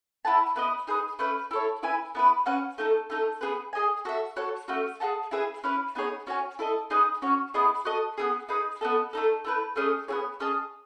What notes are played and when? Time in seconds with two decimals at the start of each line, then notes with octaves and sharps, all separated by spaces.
0.25 E4 B4 F#5 A5
0.56 B3 E4 B4 D#5
0.87 D#4 G#4 B4
1.19 A3 C#4 E4 B4
1.51 E4 A4 C#5
1.83 E4 B4 E5 G#5
2.15 B3 E4 B4
2.46 C#4 F#4 B4 F#5
2.78 A3 D#4 A4
3.10 A3 D#4 A4
3.41 B3 D#4 G#4 B4
3.73 G#4 D#5 G#5
4.05 F#4 A4 E5
4.37 F#4 A4 C#5
4.68 A3 C#4 F#4
5.00 G#4 D#5 F#5 A5
5.31 E4 G#4 B4 E5
5.64 C#4 E4 B4
5.95 B3 D#4 G#4 C#5
6.27 C#4 F#4 C#5 G#5
6.59 E4 A4 D#5
6.90 D#4 G#4 B4 D#5
7.22 C#4 F#4 C#5
7.54 B3 E4 G#4 D#5
7.85 F#4 A4 D#5
8.18 B3 E4 G#4
8.49 D#4 G#4 B4
8.81 B3 D#4 A4
9.13 A3 D#4 A4
9.45 A3 E4 B4
9.76 A3 C#4 G#4 D#5
10.08 B3 E4 G#4 C#5
10.40 C#4 G#4 D#5 A5